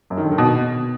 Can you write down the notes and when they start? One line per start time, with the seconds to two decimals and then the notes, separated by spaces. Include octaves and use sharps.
0.10 F#2
0.17 D#3
0.24 D3
0.31 D#3
0.38 B2